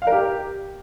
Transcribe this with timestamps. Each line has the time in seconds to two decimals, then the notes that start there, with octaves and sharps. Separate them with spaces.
0.02 F5
0.07 A#4
0.12 G4